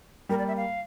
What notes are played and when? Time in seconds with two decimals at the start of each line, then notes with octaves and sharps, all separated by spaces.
0.29 G3 A#3 A#4
0.39 D5
0.48 E5
0.57 F5